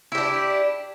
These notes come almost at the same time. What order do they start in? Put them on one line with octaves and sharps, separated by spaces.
E4 G4 D4